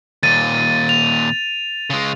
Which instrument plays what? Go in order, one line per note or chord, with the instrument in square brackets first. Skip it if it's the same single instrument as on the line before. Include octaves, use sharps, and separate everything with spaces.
[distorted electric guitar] D#2 A#2 [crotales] A6 D#7
[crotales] F7
[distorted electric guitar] C#3 G#3